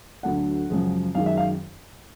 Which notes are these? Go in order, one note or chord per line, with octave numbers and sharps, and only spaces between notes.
D2 D3 F#3 A3 F#5
F#2 C#3 F3 G#3
F#2 D#3 G#3 F5
E5
F5